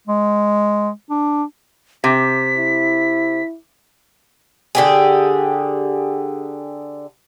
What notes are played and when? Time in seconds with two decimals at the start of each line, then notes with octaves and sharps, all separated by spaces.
0.07 G#3
1.10 D4
2.04 C3 B6
2.57 E4
4.75 D3 G4 G#4